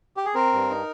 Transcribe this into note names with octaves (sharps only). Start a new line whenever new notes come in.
G4
G#4
C4 A#4
G2
D#4